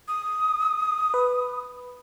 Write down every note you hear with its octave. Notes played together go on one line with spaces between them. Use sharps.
D#6
B4